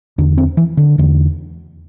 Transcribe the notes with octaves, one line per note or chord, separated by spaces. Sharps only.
E2 D3 D4
C4
E3
D3
E2 D3